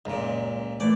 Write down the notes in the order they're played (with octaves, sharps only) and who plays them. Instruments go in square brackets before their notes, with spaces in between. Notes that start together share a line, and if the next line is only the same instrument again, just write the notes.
[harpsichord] C#2 A#2 [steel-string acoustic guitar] F#2 A#5
[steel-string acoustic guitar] E3 A3 A#3 [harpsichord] D5